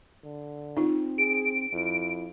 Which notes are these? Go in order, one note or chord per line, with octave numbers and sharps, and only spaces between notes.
D3
C4 D#4 F4
G#4 D7
F2 E4